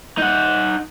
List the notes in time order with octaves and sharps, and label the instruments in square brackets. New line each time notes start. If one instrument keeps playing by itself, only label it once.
[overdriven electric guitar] D#4 F#5